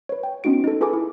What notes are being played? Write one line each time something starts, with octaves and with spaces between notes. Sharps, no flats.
B4 C#5
G5
B3 C#4 D#4 F#4 D7
D#4 A4
F4 G#4 A4 B4 G#5 D6
E4